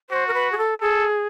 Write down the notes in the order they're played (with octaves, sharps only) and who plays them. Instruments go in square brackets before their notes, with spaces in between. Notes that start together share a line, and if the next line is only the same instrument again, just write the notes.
[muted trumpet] F#4 [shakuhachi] C5
[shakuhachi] A#4
B4
G#4
A4
[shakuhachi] G#4 [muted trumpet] A4